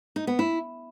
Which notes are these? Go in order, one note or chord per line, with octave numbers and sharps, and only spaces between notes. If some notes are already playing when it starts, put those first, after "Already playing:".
D#4
B3
E4